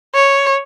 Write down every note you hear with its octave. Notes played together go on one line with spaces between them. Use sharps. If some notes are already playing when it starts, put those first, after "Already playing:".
C#5